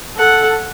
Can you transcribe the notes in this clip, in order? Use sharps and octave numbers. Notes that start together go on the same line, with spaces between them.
A4 F#5